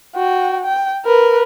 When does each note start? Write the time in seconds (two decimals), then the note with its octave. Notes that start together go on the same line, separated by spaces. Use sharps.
0.15 F#4 G5
0.65 G5
1.06 A#4 B4